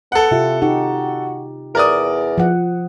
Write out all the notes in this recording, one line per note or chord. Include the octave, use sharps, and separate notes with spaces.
B3 A4 F#5
C3 E4 F4 G4
D#4 F#4 G4
E2 A#4 D5 D#6
F3 F#5